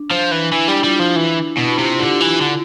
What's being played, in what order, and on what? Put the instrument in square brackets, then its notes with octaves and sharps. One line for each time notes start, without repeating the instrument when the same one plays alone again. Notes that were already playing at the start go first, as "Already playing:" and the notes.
Already playing: [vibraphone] D4
[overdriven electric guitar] F3
E3
[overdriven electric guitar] E3 [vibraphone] E4
[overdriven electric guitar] G3 [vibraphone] D4
[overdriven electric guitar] G3 [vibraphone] F4
[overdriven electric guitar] F3 [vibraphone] F4
[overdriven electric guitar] E3 [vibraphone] E4
[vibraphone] D4
[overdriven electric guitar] B2 [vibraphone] E4
[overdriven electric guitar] C3 [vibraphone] F4
[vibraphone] G4
[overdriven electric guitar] D3 [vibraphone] F4
[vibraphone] G4
[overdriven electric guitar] E3
[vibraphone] E4
[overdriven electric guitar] D3 [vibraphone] F4